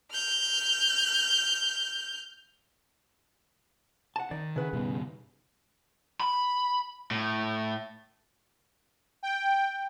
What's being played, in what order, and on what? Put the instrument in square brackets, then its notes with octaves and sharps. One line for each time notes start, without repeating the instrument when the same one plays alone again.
[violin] F6 G6
[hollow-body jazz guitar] F#5 A5
[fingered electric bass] D#3 [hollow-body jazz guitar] D5
[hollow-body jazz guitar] C#3 B4 F#5
[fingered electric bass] G2 B2 D#3
[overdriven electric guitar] B5
A2
[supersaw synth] G5